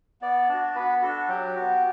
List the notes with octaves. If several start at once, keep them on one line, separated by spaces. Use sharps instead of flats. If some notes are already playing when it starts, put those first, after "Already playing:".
B3 D5
D4 F#4
B3 B4
D4 F#4 A4
F#3 G4
B3 F#4